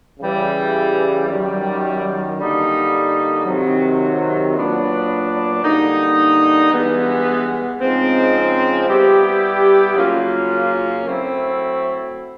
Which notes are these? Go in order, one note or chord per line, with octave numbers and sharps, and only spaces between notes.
C#3 E3 G3
F#2 D#3 G3
D3 G3 A#3 D#4
C3 D#3 F#3
A#2 F#3 B3 D4
D3 G3 A#3 D#4
G2 E3 G#3 B3
C#3 F3 G#3 C4 D#4
G3 B3 E4 G4
C#3 F#3 A#3 C#4 F4
F#3 A3 C4 E4